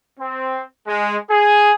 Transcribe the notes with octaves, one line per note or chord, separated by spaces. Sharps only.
C4
G#3
G#4